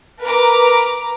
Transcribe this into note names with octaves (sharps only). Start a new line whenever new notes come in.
A#4 B4 A#5 D6